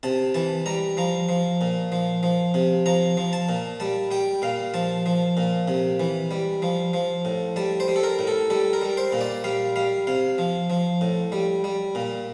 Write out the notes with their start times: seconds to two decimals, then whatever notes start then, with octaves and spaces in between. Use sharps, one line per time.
0.03 C3 A5
0.34 E3 A5
0.66 G3 A#5
0.97 F3 A#5
1.29 F3
1.61 A#2
1.92 F3
2.23 F3
2.54 C3
2.86 F3 A#5
3.17 F3
3.33 A5
3.49 A#2
3.80 G3 A5
4.11 G3 G5
4.42 A#2 F5
4.74 F3 A5
5.06 F3
5.37 A#2
5.68 C3
6.00 E3
6.31 G3
6.62 F3
6.94 F3
7.25 A2
7.56 G3 A5
7.80 C5
7.88 G3
7.96 A4
8.03 A#4
8.19 A2
8.27 A4
8.50 G3 A4
8.73 A#4
8.82 G3
8.97 C5
9.13 A#2
9.21 D5
9.44 G3 F5
9.76 G3 F5
10.07 C3 F5
10.38 F3
10.70 F3
11.01 A2
11.32 G3
11.64 G3
11.95 A#2